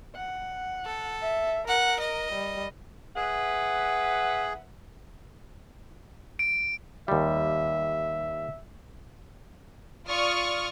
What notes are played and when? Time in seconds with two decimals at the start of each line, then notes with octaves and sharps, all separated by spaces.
0.15 F#5
0.85 A4
1.22 E5
1.68 A#4 F#5
2.00 D#5
2.33 G3
3.16 G#4 B4 E5 F#5
6.39 D7
7.08 D#2 G3 E5
10.07 F4 D5 C#6 D#6 F6